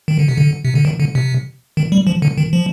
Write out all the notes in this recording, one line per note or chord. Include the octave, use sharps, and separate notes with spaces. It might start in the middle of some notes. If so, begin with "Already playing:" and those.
D#3
D3
C3
D3
C3
D3
D#3
D3
C3
D#3
G3
F3
D3
D#3
F3